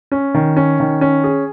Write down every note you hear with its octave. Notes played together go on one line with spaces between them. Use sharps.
C#4
D#3
C#4
D#3
C#4
G#4